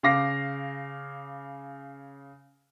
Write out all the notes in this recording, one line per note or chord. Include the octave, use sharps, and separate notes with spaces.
C#3 F5 D6 A#6 C7